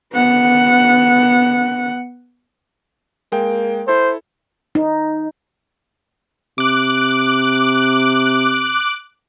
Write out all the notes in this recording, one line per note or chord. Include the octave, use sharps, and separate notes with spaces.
B3 F#5
G#3 A#3 G5
E4 A4 C5
D#4
C3 D6 F#6